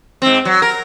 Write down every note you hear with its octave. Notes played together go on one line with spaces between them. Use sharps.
G#2 C4
F#3
A#4